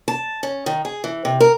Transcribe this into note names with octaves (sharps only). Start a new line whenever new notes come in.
A5
C#4
D#3
G#4
E3
C3
A#4